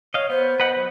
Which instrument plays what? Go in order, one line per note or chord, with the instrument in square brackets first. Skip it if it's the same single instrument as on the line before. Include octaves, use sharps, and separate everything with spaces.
[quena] C#5 [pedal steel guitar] D#5 F5
[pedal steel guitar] B3 [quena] C5
[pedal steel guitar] B4 D#5 F#5
F#3